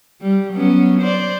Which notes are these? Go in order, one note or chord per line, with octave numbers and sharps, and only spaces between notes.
G3
F#3 B3 C#4
C5 D5